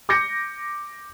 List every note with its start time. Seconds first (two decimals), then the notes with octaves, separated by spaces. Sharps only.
0.09 D6 G6 A#6 C#7